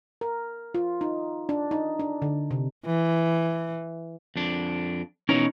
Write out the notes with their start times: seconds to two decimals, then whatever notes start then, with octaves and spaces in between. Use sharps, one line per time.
0.21 A#4
0.75 F4
1.01 D#4
1.49 D4
1.71 D#4
2.00 D4
2.22 D3
2.51 C3
2.86 E3
4.36 F2 D4
5.29 B2 E3 C#4 D#4 A#4 C#5